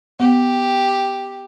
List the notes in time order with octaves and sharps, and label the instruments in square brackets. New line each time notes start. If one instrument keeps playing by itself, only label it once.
[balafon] B3 [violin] G4